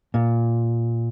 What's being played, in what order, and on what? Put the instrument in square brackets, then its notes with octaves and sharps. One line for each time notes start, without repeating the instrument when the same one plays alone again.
[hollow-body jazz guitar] A#2